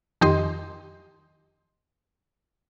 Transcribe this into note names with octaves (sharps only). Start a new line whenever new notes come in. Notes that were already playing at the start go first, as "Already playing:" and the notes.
F2 D#3 G4 D#5 C6